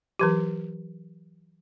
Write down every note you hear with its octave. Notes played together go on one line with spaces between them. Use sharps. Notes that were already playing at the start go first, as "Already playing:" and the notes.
E3 F#3 G4